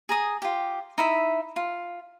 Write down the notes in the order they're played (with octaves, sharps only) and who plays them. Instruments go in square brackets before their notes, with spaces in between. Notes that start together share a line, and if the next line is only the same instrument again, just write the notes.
[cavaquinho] G#4 A#5 D#6
F4 G4
D#4 E4 E5
F4